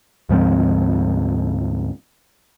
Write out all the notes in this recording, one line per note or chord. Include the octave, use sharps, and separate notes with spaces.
D2 G#2 F3 C4